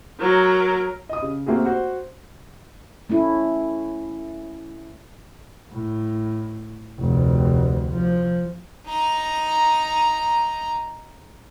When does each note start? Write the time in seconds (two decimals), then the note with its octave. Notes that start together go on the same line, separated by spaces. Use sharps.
0.19 F#3 A#4
1.09 D#5 D#6
1.22 C#3
1.46 A3 A#3 C4 F#4 G#4
1.65 F#4 C5 F#5
3.10 A3 C#4 E4
5.72 A2
6.99 F1 D2
7.91 F3
8.87 D#4 A#5